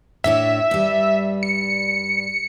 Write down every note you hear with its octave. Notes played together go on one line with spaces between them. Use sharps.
A2 D4 C#5 E5
G2 G3
C#7